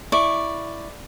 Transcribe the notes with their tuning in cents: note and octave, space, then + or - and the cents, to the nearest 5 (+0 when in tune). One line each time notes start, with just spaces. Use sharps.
E4 +0 D5 +0 C#6 -5